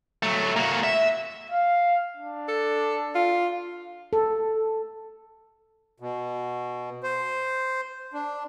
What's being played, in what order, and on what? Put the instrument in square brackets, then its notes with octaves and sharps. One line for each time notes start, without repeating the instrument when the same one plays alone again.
[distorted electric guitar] F#3 A3
A#3 F#4
E5
[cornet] F5
D4
[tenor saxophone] A4
F4
[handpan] A4
[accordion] B2
C5
D4